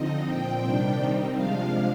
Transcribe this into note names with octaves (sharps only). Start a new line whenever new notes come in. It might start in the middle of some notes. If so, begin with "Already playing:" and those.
Already playing: D3 F3 C4 D#4 D#5
A#2 F3 C4 G5
C3 D#3 G3 D4
D#3 G3 C4 D#4
C3 F3 G#3 D4 F5